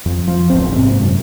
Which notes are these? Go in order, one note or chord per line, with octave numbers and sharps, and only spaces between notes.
F2
F3
D1 A1 C4
G#2 C3
F#2